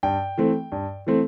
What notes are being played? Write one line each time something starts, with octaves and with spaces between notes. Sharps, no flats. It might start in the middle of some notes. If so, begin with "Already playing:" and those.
G2 G5
E3 A3 C4
G2
E3 A3 C4